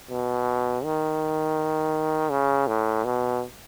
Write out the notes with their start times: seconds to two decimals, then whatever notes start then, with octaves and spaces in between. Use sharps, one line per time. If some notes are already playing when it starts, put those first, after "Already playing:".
0.11 B2
0.84 D#3
2.31 C#3
2.68 A2
3.05 B2